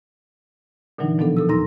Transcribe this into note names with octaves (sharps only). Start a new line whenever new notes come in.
A#2 D3 E3 F#3 D4 D#4
B2 F3 F#3 B3 D4 A4
A#2 A4 E6
D#2 D#4 A#5 C6 E6 A#6